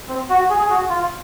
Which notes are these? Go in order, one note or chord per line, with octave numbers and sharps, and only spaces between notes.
C4
F#4
G#4
G#4
F#4
F4